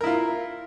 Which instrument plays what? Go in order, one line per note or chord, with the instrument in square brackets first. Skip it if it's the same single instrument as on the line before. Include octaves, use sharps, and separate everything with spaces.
[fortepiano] A#4
E4
F4